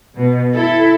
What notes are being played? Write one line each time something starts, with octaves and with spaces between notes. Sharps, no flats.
B2
E4 A4